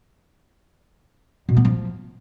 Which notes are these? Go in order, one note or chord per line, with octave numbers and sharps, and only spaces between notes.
B2
B3
F3